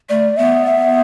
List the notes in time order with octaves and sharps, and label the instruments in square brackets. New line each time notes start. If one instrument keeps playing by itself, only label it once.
[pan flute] A3 [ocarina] D5
[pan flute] B3 [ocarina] E5
[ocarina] E5